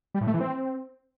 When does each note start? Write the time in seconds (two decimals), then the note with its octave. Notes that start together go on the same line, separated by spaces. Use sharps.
0.14 G3
0.21 A2
0.27 A3
0.34 E3
0.40 C4